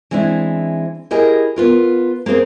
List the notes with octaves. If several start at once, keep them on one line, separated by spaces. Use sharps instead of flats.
E3 G#3 C4 D4 E4
E4 G4 G#4 A#4 D#5
B3 F4 A#4
A#3 C4 G#4 C5